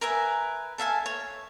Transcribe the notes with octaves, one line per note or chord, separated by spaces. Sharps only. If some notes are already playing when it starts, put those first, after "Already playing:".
A#4 B4 E5 G#5
A4 E5 F5 G#5
C#5